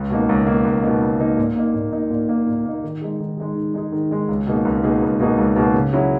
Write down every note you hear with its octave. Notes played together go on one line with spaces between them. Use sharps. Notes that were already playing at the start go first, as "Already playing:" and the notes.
Already playing: C#2
B2 A#3 D#4
C#2
B2 A#3 D#4
C#2
B2 A#3 D#4
C#2
B2 A#3 D#4
A#2
A#3 D#4
A#2
A#3 D#4
A#2
A#3 D#4
A#2
A#3 D#4
D#3
G#3 D#4 G#4
D#3
G#3 D#4 G#4
D#3
G#3 D#4 G#4
D#3
G#3 D#4 G#4
C#2
B2 A#3 D#4 G#4
C#2
B2 A#3 D#4 G#4
C#2
B2 A#3 D#4 G#4
C#2
B2 A#3 D#4 G#4
C#3
F#3 C#4 E4 G#4